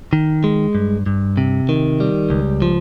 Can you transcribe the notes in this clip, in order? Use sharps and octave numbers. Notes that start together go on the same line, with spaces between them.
D#3
G#3
G2
G2
C3
D#3
G3
C#2
F3